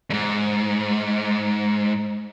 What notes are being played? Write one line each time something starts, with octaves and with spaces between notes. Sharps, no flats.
E2 G#2